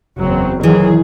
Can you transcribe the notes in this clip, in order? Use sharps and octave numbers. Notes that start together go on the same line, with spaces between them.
F#1 E2 F#3 C4
D#3 E3 F#3 G#4